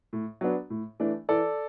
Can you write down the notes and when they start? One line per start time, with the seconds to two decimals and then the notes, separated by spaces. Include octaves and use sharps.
0.13 A2
0.41 F#3 B3 D4
0.70 A2
1.00 E3 A3 D4
1.29 E3 A4 D5